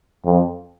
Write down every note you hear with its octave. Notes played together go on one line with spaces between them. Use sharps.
F2